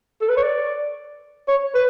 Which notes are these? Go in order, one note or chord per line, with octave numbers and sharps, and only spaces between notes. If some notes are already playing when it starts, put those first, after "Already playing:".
A4
B4
C#5
D5
C#5
B4